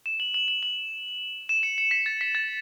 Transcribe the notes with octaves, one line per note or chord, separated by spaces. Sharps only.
E7
F#7
F#7
F#7
F#7
E7
C#7
C#7
B6
A6
B6
A6